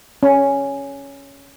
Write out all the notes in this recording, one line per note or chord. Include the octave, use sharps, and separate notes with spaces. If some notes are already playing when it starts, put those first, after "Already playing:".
C#4